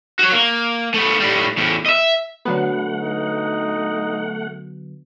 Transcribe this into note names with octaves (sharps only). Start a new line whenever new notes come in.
F#4 C#5
A#3
A3 B3
A2 G3
E2 A2
D#5 E5
D3 F#3 A3 B3 F#5
D#4